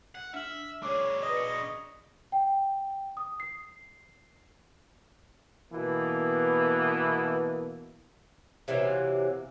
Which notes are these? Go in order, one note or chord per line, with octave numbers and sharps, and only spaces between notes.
F#5
D4 E5 F6 F#7
D4 G#4 C#5 C#6 D6
B4 D5 D#5
C#6 A#6 C#7
G5
D#6
C7
B2 E3 A#3 B3
C3 E3 F#3 A#3